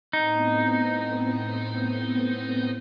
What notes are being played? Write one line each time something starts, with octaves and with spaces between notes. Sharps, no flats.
A2 B3 C4 D#4